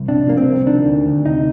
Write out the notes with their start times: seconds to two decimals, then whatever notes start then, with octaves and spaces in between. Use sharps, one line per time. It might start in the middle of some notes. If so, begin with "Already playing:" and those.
Already playing: C2
0.08 C3 D4
0.27 F3 A#3
0.37 C4
0.47 C2
0.66 D#3 D4
0.86 D2
1.06 D2
1.25 C3 D#4